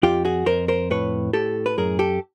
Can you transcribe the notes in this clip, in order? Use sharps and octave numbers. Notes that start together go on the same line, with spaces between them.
F2 F4 G4
F#4 G#4
F2 A#4 C5
A#4 C5
A2 B4 C#5
A2 G4 A4
B4
F#2 G#4 A#4
G4 A4